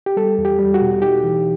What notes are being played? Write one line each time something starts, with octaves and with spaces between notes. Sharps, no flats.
G4
G3 A4
E2
G4
G3
F#4
B2
D#4 G4
E3